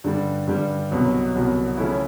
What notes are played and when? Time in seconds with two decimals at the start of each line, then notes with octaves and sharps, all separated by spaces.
0.04 G2 D3 G3
0.47 G2 D3 G3
0.91 C2 B2 F#3
1.34 C2 B2 F#3
1.78 C#3 F3 A3 C#4 E4